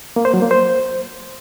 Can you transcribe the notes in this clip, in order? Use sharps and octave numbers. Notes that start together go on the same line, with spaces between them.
A#3
C5
F#3
A#3
C5